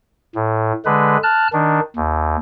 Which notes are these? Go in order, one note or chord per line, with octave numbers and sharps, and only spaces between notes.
A2
D3 G#3 B4
A5 F6 F#6
D#3 D4
D#2